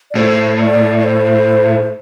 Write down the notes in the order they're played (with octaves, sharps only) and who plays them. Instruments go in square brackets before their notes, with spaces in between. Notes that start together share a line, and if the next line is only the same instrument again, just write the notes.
[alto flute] D5
[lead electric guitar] A2 [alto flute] C5
[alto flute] D5
D5
C5